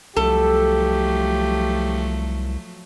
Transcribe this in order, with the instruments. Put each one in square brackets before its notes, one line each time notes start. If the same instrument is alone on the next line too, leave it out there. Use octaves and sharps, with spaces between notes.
[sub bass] C2 [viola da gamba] F3 F#3 A3 [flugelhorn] G4 [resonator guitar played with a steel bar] A4